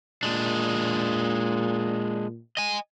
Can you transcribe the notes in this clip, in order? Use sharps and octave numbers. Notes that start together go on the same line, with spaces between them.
A#2 G#3 D4
D#5 G#5